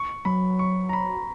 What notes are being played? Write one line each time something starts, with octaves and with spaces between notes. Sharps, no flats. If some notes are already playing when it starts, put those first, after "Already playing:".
Already playing: C#6
F#3 B5
C#6
A#5
B5